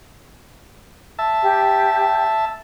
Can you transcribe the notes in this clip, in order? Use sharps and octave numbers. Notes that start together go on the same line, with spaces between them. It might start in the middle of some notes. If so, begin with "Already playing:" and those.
E5 A5
G4